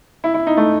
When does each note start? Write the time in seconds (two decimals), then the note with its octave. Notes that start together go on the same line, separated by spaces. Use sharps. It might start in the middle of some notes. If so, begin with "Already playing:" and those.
0.24 E4
0.34 E4
0.47 D#4
0.57 A3